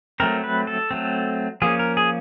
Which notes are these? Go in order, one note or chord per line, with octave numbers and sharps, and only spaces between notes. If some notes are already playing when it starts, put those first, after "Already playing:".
F#3 A3 C4 A#4
B4
A4
F#3 A3 C4
F3 A#3 C#4 G#4
A#4
G#4